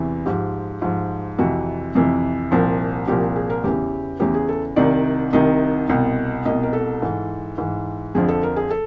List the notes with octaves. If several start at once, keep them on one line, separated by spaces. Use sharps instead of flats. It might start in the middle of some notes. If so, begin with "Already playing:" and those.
Already playing: E2 C3 E3
G#2 F3 G4
G#2 F3
F2 C3 E3 F#4
F2 C3 E3
C2 A#2 F3
C2 A#2 F3 G4
G#4
A#4
E2 C#3 E3 G4
E2 C#3 E3 G4
G#4
A4
C2 C3 D#3 D5
C2 C3 D#3 D#5
C2 B2
C2 B2 D#5
A#4
A4
G#2 E3
G#2 E3
F2 D3 F3 G#4
A4
A#4
G#4
A4